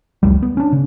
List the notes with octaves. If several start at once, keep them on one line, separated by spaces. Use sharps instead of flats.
F1 C#2 G3
B3
C#4 D4
C#3